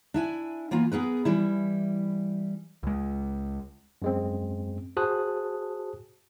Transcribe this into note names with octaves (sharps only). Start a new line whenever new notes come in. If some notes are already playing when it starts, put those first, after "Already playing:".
D4 E4 G#5
E3 A#3 B3 F4
B3 G#4 A#4 B4
E3 G3 E4
C#2 G#3
F#2 G#3 C4
F#4 G#4 C5 A5 D#6 F#6